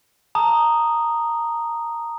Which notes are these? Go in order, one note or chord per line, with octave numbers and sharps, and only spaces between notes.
A5 A#5 D#6